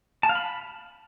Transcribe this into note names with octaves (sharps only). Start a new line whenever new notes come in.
A5
F5
B5